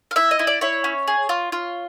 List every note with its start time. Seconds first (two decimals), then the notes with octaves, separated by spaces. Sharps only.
0.11 F5
0.16 E4 E5
0.31 D#5
0.39 E4
0.47 D5
0.61 E4 C#5
0.84 C#4
1.07 G#4
1.29 F4
1.52 F4